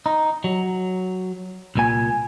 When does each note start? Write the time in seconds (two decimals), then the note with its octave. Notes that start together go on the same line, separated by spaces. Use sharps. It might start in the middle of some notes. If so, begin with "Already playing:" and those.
0.06 D#4
0.44 F#3
1.75 C2 A#2 G#5